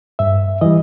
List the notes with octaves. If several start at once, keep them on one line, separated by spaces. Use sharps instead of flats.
G2 E5
E3 G3 D#5